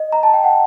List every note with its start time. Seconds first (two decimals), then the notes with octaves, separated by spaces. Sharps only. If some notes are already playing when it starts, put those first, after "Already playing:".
Already playing: D#5
0.12 A#5
0.23 A5
0.34 G5
0.44 F#5